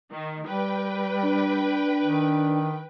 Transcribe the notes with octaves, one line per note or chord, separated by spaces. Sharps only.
D#3
G3 B4 G5
D4
D#3